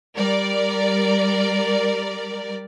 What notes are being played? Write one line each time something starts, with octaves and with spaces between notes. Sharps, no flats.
G3 A#4 D5